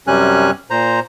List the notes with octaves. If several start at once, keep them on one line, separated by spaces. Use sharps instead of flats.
F#2 C3 G3 C#4 G#5 F#6
A#2 C5 A#5